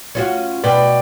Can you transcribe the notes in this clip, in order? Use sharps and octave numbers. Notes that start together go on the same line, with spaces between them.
C#4 F4 F#4
B2 E4 B4 D5 G5